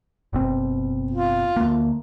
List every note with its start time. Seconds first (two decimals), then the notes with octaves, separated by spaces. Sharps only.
0.33 F#1 B2 C4
1.11 F4
1.56 D2 A#3